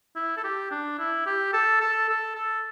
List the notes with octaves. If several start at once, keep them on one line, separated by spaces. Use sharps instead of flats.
E4
A4
G4
D4
E4
G4
A4
A4
A4
A4